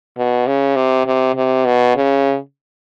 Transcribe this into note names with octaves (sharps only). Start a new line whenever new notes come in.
B2
C#3
C3
C3
C3
B2
C#3